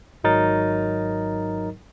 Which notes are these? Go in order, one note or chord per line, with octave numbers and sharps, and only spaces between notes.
G#1 G#2 F#3 D#4 A#4 A6